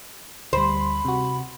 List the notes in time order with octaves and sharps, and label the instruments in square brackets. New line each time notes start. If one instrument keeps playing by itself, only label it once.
[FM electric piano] D2 G3 [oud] C5 [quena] B5
[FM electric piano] C3 F#4